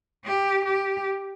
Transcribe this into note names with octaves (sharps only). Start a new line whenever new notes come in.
G4
G4